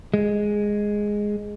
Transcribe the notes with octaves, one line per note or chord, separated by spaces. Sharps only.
G#3